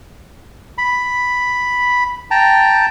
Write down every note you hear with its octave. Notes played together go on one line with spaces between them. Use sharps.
B5
G5 A5 A#5